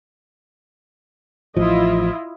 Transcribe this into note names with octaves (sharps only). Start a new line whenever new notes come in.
A1 F3 E4 F4 D#5